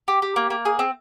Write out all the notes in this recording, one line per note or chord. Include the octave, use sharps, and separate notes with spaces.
G4
G4
A#3
A#3
G#4
C4